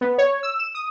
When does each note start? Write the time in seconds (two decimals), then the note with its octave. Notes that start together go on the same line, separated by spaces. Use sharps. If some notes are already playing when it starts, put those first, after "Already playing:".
0.01 B3
0.18 C#5
0.43 E6
0.59 E7
0.75 D#6